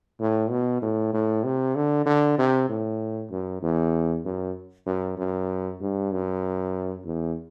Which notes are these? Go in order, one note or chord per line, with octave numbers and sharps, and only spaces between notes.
A2
B2
A2
A2
C3
D3
D3
C3
A2
F#2
E2
F#2
F#2
F#2
G2
F#2
E2